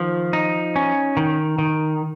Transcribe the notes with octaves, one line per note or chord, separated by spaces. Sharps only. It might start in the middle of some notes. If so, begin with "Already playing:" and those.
Already playing: D#3 F3
D#4
C#4
D#3
D#3